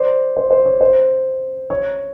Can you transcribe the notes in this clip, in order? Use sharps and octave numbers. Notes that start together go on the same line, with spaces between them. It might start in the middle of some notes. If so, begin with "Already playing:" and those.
Already playing: C5 D5
C5
C5
C#5
C5
C#5